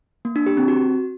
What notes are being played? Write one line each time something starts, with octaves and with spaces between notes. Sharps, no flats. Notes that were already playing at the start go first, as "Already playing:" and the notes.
A#3
D4
G4
C4
F#4